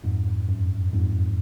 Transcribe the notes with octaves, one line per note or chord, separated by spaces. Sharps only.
F2 G#2
F#2
F2 G#2